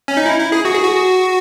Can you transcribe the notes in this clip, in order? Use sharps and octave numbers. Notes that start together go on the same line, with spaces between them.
C#4
D#4
E4
E4
G#4
F#4
G#4
F#4